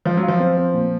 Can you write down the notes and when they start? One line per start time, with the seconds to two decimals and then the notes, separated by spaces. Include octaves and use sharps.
0.05 F3 F4
0.17 F#3
0.23 F4
0.28 F3
0.39 C4
0.57 C4
0.74 A#2